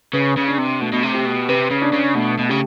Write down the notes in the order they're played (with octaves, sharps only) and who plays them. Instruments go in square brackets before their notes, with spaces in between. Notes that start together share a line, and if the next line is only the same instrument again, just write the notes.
[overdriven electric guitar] C#3 [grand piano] B4
[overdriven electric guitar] C#3
[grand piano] D4
[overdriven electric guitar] C3
[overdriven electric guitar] B2 [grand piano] A3
[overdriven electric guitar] B2
C3
[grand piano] G4
[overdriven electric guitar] B2
[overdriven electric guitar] C3 [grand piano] B4
[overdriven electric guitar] C#3
[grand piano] D4
[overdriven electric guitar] C#3
[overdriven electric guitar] B2 [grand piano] A3
[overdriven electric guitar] B2
[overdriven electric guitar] C#3 [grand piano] G4